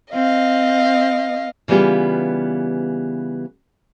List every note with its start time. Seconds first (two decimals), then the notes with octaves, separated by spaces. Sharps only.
0.14 C4 D#5 F5
1.68 C#3 E3 G3 B3 F4 G4